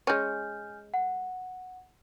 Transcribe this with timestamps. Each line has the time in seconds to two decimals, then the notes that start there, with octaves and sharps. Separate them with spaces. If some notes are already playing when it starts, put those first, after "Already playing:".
0.07 G#3 C#4 G#5 F6 G6
0.94 F#5